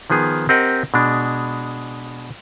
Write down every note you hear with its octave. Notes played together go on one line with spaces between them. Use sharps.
D#3 F3 B3 G#4
C4 G4 A#4 D#5 F#5
B2 G#3 D4